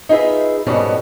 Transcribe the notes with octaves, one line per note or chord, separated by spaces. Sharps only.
D#4 F4 G#4 B4 E5
F2 G#2 B2 G3 C#4 A5